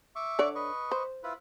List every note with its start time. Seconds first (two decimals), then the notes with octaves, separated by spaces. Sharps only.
0.16 E5 C#6 D6
0.39 D3 C#5 D5
0.55 B4 D#5 C#6
0.91 C5
1.23 E4 F4 B4